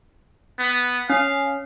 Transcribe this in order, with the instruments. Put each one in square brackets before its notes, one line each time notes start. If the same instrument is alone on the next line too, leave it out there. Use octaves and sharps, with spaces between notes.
[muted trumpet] B3
[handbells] C#4 [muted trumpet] F5